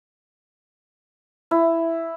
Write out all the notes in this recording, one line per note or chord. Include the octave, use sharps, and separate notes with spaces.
E4